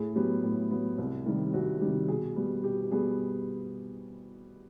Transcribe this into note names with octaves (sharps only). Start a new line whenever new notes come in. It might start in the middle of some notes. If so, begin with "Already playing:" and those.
Already playing: A2 G#4
F#3 B3 G4
A2
F#3 B3
C2
C3 D#3 G3
C2 F#4
C3 D#3 G3 G4
B2 G#4
G3 B3
B2 G4
G4
G3 B3 G#4